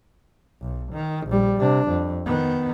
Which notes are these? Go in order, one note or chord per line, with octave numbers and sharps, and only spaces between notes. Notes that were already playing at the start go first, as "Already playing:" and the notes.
B1
D#3
A#1 G3
C3 D4
F2
D#3 B3